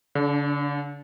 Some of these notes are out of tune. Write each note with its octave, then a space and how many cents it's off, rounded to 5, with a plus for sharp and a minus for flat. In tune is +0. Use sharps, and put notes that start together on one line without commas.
D3 -40 D4 +0